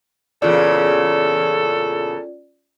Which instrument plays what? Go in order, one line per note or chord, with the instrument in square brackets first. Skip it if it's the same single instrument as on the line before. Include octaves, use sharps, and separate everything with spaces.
[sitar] E2 A#2 C#3 [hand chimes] C#4 F4 D5 [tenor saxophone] A4